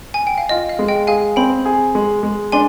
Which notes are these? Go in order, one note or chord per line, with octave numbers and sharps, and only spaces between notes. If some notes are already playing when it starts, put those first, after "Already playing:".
G#5
G5
F5
F4 D#5
F5
G#3
D#5 G5
G#4 F5 G#5
C4 G5 B5
G#4
G#3
G#3
D4 G#5 C6